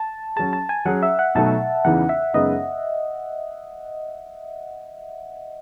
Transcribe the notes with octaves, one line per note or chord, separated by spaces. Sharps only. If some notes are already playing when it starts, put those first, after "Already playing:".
Already playing: A5
F#3 C#4 G#4 A5
A5
G#5
F#3 C#4 G#4 F#5
E5
F#5
B2 F#3 A3 D#4 A5
E2 C#3 E3 B3 D#4 F#5
E5
F#2 C#3 G#3 B3 D#4 D#5